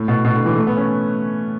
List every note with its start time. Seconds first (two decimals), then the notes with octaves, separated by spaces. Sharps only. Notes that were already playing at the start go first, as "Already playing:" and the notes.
Already playing: A2
0.08 B2
0.24 B2
0.35 D3
0.45 E3
0.56 A3
0.67 B3
0.77 C#4